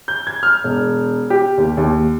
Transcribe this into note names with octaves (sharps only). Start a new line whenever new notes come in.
G6
G#6
F6
E1
G4
D#2
D#2